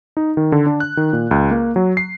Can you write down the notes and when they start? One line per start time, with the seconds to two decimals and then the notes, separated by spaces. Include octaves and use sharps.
0.17 D#4
0.37 D#3
0.52 D3
0.66 D4
0.80 F#6
0.97 D#3
1.13 A#2
1.31 C#2
1.51 A#3
1.76 F#3
1.97 C7